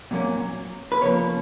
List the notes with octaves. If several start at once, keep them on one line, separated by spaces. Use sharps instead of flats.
A#2 F#3 A#3 C#4
B4
C#3 F3 A#3 C#4 C#5